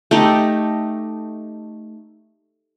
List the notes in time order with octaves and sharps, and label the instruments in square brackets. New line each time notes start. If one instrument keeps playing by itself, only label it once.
[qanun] A3 D#4 G4